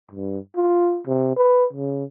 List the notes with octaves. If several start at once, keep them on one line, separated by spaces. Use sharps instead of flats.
G2
F4
C3
B4
C#3